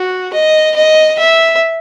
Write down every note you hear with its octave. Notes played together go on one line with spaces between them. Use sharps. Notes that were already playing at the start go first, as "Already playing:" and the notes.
Already playing: F#4
D#5
D#5
E5